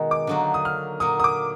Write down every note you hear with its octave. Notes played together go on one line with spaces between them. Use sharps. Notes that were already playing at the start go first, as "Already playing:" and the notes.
Already playing: B2 D#3 G#3 D#4 F#4
D6
D3 F#3 A#3 D#4 F#4
D#6
F6
A#2 F#3 A#3 D#6
D#6
D6